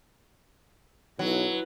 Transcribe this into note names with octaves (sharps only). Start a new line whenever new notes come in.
B1 F#3 E4 B4